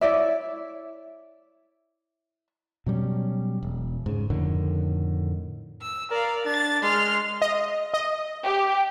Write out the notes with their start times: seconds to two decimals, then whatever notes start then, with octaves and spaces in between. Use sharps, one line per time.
0.01 E4 C#5 D5 E5
2.86 B2 F#3 G3 C#4
3.63 E1
4.06 G#2 C#3
4.30 F2 A2 D3 D#3
5.82 E6
6.11 A#4 D5 F5
6.45 D4 A6
6.82 G#3 C6 F6
7.42 D#5
7.94 D#5
8.43 G4